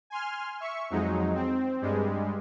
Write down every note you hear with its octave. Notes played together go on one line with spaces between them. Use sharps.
G#5 C6 F6
E5 C#6
F2 F#3 G#3 D#4
C4
G2 G3 G#3